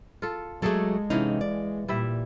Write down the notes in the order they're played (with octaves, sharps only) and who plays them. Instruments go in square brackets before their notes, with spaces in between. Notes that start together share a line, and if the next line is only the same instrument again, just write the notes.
[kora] F4 A4
[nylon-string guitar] F#3 A3 [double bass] G#3 [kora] G#4 A4 D5
[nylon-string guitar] C3 C#4 D#4 [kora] E3 F5
[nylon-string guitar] D5
[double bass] A#2 [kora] G3 E4 E5